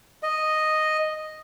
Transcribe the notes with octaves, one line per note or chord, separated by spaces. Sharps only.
D#5